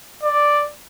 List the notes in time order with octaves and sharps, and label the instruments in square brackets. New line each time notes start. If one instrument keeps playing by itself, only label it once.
[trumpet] D5